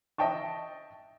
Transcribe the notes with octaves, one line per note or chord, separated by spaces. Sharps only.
D#5 E5 G5 A5 C#6